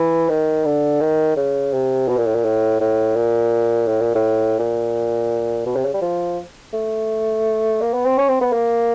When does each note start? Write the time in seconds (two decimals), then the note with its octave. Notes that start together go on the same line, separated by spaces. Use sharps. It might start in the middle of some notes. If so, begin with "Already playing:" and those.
Already playing: E3
0.30 D#3
0.65 D3
1.01 D#3
1.36 C#3
1.73 C3
2.08 B2
2.17 A#2
2.27 A2
2.35 A#2
2.45 A2
2.80 A2
3.16 A#2
3.87 A2
4.01 A#2
4.15 A2
4.59 A#2
5.66 B2
5.76 C3
5.85 C#3
5.94 G3
6.02 F3
6.73 A3
7.82 A#3
7.94 B3
8.05 C4
8.18 C#4
8.29 C4
8.41 B3
8.53 A#3